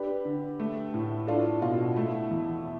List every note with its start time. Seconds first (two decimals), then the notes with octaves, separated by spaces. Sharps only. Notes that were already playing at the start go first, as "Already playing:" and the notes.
Already playing: D4 G4 B4
0.25 D3
0.60 A3
0.94 A2
1.27 D4 F4 A4
1.62 B2 F4
1.96 A3 E4
2.31 E2